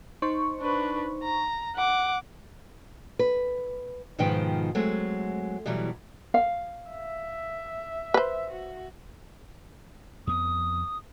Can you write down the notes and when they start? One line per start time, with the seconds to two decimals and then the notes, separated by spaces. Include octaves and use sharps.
0.22 D#4 C5 C#6
0.61 D4 B4
1.24 A#5
1.75 F#5 D6
3.19 B4
4.18 G#2 B2 D#3 F3 B4 G5
4.75 F#3 G#3 A3 C4
5.66 B2 E3 F#3 G3
6.34 F5
6.90 E5
8.14 B4 C5
8.50 F#4
10.27 F2 B3 D#6